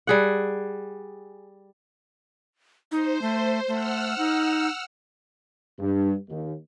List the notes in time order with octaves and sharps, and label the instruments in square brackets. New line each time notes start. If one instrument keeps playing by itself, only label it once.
[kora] G3 G#4 F#5
[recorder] D#4 [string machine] C5
[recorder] A3
[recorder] A3 [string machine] F#5 E6 F6
[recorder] D#4
[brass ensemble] G2
D#2